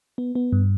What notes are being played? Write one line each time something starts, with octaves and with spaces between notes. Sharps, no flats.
B3
B3
G2